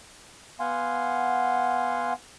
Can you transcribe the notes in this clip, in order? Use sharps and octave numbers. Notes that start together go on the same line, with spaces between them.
B3 F5 F#5 G#5 C6